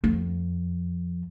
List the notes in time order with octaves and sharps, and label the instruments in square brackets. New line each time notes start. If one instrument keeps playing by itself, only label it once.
[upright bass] F2